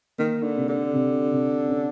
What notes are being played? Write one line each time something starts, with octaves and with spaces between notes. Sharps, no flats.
D#3 A#3
D3
C3
D3
C3
C3
C#4